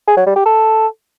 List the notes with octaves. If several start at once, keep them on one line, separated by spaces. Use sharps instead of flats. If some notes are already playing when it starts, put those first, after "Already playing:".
G#4
F#3
G3
G4
A4